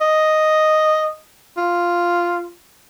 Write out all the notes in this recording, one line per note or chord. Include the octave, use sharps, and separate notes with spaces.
D#5
F4